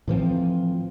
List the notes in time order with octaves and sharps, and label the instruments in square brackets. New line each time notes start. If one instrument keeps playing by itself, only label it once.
[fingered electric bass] A2 E3 F3 C4